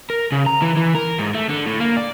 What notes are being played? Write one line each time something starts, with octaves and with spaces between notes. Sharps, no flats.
A#4
C#3
A#5
E3
E3
A#4
G#2
A3
D3
A2
A#3
D5